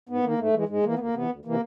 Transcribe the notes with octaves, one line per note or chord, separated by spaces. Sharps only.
G#2 B3
D#3 A#3
G#2 A3
E3 G#3
G#2 G#3
E3 A#3
B3
D2 A#3
C3 E3 B3
D2
C3 E3 A#3